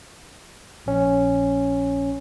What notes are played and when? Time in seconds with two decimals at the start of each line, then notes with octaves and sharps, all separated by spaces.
0.86 A#1 C#4